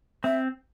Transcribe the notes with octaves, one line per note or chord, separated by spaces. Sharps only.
C4 E5